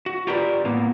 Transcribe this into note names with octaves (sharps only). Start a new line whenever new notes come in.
F#4
F4 G4 A#4 B4 D5
A2 A#3 B3